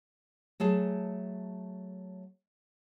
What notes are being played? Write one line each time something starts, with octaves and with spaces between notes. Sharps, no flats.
F#3 A3 G#4 A5